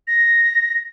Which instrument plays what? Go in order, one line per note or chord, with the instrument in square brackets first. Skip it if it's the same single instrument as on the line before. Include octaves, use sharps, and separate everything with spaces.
[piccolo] A#6